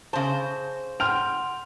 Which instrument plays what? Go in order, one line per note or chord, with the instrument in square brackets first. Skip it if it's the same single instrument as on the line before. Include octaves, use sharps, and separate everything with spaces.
[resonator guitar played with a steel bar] C#3 C5 [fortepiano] A5
[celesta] F#5 C6 G6 [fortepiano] G5 [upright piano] F6 F7